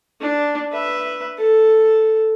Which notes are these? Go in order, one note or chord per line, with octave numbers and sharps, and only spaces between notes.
D4
B4 E5
A4